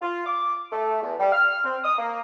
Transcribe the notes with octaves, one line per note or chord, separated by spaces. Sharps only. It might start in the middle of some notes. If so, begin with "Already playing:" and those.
F4
D6
A3
E2
G3
F6
C4
D#6
A#3